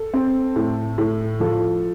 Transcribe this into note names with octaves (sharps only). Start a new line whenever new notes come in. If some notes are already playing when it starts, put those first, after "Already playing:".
Already playing: A4
C4
A2
A2
F3 A4